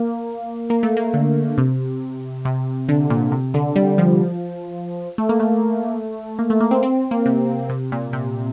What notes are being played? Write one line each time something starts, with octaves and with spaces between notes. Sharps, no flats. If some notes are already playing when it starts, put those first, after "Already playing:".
Already playing: A#3
A#3
A3
A#3
D3
C3
C3
D3
A#2
C3
D3
G3
F3
A3
A#3
A3
A#3
A3
A#3
C4
C4
A#3
C3
C3
A#2
C3